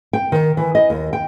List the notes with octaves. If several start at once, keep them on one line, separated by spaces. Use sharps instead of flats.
G5
D#3
E3
D#5
D#2
G5